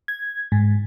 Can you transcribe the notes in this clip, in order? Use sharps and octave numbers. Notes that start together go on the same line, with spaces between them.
G#6
G#2